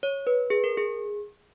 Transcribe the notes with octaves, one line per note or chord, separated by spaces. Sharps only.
C#5
B4
G#4
A#4
G#4